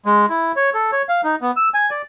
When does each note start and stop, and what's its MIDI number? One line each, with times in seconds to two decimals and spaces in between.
0.05 0.26 56
0.29 0.52 64
0.56 0.70 73
0.74 0.91 69
0.92 1.02 73
1.09 1.21 77
1.24 1.35 63
1.41 1.51 59
1.56 1.69 88
1.74 1.90 80
1.90 2.02 74